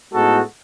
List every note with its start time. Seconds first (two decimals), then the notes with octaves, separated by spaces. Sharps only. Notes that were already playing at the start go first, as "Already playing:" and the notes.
0.12 A2 G#3 B3 D#4 F#4 A4